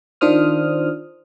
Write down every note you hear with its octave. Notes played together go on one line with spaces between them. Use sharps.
D#3 D4 F4 C5 D#6 F6